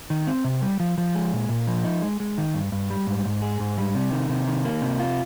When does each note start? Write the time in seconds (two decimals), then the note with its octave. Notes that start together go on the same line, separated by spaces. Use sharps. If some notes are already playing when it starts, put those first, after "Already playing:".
0.10 D#3
0.27 C4
0.44 C3
0.62 G3
0.80 F3
0.98 F3
1.14 G#3
1.33 A#2
1.49 A#2
1.67 F3
1.84 D#4
2.02 G#3
2.20 G#3
2.38 D#3
2.54 G2
2.72 G2
2.90 G3
3.07 G#2
3.25 G#2
3.42 G#4
3.60 G#2
3.78 G3
3.95 C3
4.12 D#3
4.29 C3
4.47 D#3
4.65 A#3
4.82 C3
5.00 F4